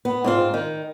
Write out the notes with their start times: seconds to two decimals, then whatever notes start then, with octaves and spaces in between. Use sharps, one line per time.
0.05 B3
0.24 G#2 C4 F4
0.54 D#3